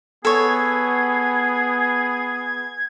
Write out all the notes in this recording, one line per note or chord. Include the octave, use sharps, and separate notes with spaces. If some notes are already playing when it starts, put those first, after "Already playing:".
B3 G#4 A4 C#5 G#6